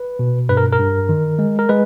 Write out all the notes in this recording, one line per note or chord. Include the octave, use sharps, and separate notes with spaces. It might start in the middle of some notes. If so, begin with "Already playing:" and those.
Already playing: B4
B2
G2 B4
A#4
A#4
G2
D#3
G#3
A#4
G#3 B4